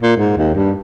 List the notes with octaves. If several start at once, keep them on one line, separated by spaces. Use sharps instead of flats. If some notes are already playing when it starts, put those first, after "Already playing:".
A#2
G#2
D#2
G2